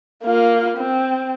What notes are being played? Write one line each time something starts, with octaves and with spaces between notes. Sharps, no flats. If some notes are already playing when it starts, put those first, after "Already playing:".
A#3 F4
C4